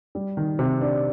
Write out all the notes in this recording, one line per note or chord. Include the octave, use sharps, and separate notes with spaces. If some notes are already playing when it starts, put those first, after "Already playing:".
G3
D#3
C3
D4